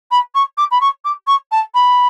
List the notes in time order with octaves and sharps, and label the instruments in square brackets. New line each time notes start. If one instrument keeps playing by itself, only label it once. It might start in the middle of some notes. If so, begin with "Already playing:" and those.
[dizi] B5
C#6
D6
B5
C#6
D6
C#6
A5
B5